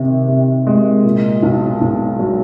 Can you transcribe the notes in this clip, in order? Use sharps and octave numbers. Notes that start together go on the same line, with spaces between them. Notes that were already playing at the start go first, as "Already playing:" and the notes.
Already playing: C3 D#3
C3
G#3
A#2
B1
B1
F#3